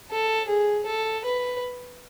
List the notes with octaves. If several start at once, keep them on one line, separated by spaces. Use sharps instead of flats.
A4
G#4
A4
B4